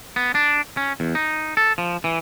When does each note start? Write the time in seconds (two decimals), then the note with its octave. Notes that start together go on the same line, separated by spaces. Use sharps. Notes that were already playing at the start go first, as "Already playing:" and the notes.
0.16 B3
0.35 D4
0.77 C#4
1.00 E2
1.15 D#4
1.57 A4
1.78 F3
2.04 E3